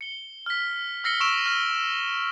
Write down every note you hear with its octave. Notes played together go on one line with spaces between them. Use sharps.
C#7 G7
F6 B6
E6 F6 A#6 C7 C#7 G7
C#6 E6 D7 E7 F7
F6 G7